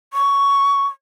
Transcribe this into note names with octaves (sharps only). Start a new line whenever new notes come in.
C#6